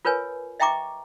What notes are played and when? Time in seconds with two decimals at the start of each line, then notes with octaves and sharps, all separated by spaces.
0.05 F4 A#4 B4 C#5 G#5
0.60 D#5 E5 G5 A#5 C#6 D6